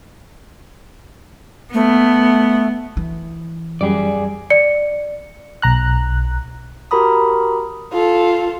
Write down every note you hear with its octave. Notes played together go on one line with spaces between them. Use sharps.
A3 B3
E3
F#2 G3 G#4 D5
D5 C#7
B1 A#5 F#6
F#4 G4 A#4 A#5 B5 D#6
F4 A4